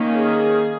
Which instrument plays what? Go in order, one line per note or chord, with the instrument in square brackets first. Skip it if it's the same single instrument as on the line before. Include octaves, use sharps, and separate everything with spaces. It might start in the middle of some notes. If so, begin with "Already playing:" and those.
Already playing: [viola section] D#3 A#3 C#4
G#4